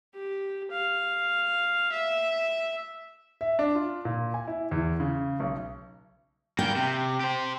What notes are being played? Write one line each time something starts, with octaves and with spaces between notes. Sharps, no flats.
G4
F5
E5
E5
D4
F4
A#2
G#5
E4
E2
C#3
B1
A#3 B3 G5
C3
G4 C5